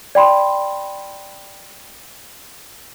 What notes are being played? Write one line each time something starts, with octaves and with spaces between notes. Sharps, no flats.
D5 G5 B5 C6